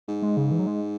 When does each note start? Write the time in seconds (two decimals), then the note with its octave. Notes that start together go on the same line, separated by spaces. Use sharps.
0.08 G#2
0.22 G#3
0.37 C#3
0.52 E3
0.59 F#3
0.67 G#3